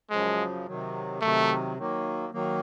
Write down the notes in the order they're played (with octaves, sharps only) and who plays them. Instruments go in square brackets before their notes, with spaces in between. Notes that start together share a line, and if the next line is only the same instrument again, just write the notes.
[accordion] F#2 C#3 F3 [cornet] G#3
[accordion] C3 D#3 F#3
[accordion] C3 D#3 F#3 [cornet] A3
[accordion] D#3 F#3 A#3
D#3 F#3 A#3